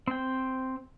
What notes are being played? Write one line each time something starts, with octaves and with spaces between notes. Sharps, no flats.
C4 G5